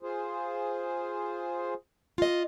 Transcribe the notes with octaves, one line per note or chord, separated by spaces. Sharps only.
F4 G#4 C5
F4 D#5